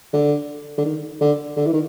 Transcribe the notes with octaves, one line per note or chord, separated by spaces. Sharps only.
D3
D3
D#3
D3
D3
E3
D#3